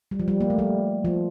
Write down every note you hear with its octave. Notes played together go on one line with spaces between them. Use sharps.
G3
F3
G3
A#3
A3
G3
F3